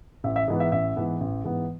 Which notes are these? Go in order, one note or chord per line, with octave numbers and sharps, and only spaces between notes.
A1 E5
E5
G#2 E3 B3 D#5
E5
A1 E5
G#2 E3 B3
A1
G#2 E3 B3